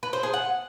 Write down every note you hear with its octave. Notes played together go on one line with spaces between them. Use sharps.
B4
C5
G#4
F#5